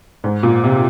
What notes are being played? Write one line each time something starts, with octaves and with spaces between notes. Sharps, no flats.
G#2
A#2
C3